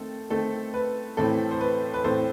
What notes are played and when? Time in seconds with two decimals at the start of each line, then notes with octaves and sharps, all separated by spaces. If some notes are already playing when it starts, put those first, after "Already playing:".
Already playing: D#3 A3 C4 A4
0.30 D#3 A3 C4 A4
0.74 B4
1.17 A2 E3 A3 C4 A4
1.51 C5
1.61 B4
1.94 B4
2.04 A2 E3 A3 C4 A4 C5